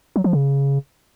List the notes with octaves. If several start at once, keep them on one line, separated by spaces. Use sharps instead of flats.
F#3
F3
C#3